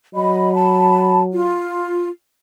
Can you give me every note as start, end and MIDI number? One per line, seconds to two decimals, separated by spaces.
0.15 1.56 54
0.15 0.53 75
0.15 0.53 83
0.54 1.20 81
0.54 1.20 83
1.33 2.07 65